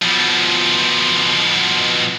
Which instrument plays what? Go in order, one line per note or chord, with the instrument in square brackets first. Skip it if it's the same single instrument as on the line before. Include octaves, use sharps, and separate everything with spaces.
[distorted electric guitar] B2 F3